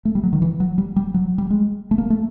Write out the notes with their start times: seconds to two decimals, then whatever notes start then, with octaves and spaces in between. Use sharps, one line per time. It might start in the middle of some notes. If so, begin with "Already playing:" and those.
0.05 A3
0.15 G3
0.23 F#3
0.33 D#3
0.42 E3
0.60 F#3
0.78 G3
0.96 G3
1.14 F#3
1.38 G3
1.50 G#3
1.91 A3
1.98 A#3
2.10 A3